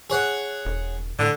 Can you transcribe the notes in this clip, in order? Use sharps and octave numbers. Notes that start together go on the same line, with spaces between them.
G#4 C#5 F#5
E1
A2 D3